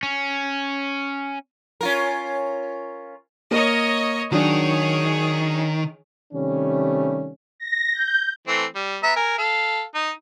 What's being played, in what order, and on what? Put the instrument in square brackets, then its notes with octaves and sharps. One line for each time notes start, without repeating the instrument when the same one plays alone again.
[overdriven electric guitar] C#4
[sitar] C#4 F4 A#4
[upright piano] A#3 A#4 [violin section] C#5 D#5
[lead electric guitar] D#3 [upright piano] F#3 D4 [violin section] G#4 C#5
[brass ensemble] C3 D#3 G3 A3 C#4
[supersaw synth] A#6
G6
[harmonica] E3 A3 C4
G3
B3 E5 A#5
A#4 G#5
A4 F5
D#4